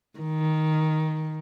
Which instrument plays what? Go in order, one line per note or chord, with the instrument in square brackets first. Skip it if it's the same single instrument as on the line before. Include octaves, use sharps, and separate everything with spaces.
[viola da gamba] D#3